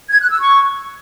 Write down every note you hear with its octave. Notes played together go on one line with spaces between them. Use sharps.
G#6
F#6
E6
C#6